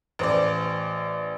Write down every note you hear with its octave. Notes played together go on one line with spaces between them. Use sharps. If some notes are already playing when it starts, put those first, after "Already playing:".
A1 C5 D5